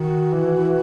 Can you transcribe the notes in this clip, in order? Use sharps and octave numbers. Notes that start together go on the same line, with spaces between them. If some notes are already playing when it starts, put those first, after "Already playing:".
Already playing: D#3 F#4
E3